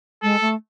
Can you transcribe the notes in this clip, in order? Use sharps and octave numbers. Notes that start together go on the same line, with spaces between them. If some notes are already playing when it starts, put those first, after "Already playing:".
G#3 A4
A3